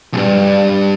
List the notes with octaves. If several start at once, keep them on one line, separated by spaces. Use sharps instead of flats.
B1 G2